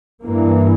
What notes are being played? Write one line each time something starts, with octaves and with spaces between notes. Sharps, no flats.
G2 E3 A#3